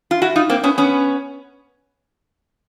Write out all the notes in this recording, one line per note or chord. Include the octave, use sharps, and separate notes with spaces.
F4
E4 F#4
D#4 F4
A#3 C4
B3 C#4
B3 C#4